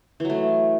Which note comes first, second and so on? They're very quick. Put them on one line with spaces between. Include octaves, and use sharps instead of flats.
E3 F#3 A3